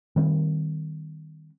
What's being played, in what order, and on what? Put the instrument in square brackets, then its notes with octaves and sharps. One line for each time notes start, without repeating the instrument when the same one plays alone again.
[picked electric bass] D#3 G3 C4